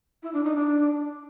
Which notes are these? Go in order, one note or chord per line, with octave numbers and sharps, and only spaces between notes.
E4
D4
D#4
D4